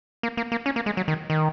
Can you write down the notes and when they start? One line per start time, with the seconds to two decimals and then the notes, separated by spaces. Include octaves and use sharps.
0.23 A#3
0.37 A#3
0.52 A#3
0.66 C#4
0.76 A#3
0.86 G#3
0.97 F#3
1.08 D#3
1.30 D#3